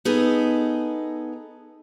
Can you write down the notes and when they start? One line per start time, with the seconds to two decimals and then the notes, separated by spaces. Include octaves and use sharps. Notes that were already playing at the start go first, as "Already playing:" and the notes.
0.05 B3 D#4 G#4 A4